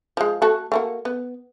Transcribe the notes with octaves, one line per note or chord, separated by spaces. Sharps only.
F3 G#3
A3 F#4 A4
A3 A#3 F#4
B3